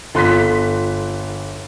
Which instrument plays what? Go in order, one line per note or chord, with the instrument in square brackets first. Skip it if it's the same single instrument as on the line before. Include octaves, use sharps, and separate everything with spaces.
[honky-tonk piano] G1 F#6 B6 [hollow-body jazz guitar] F4 A4 C6